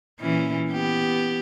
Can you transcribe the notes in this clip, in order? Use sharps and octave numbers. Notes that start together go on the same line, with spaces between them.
A#2 E3 C#4
B3 G4